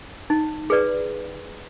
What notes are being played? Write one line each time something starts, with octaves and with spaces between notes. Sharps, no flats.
D#4
G#4 B4 D5